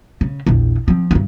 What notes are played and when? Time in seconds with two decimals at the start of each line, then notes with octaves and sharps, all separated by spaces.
0.21 C#3
0.47 A#1 E2
0.88 F3 C4
1.11 G2 C4